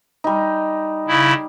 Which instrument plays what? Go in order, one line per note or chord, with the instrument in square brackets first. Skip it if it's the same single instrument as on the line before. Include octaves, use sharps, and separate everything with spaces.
[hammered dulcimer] G3 D#4
[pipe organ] C#3 E4